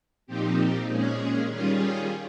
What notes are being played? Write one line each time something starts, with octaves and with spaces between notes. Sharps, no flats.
A#2 F3 C4 D#4 G4
A#2 G#3 C#4 G#4
D#3 G3 C#4 F4 G#4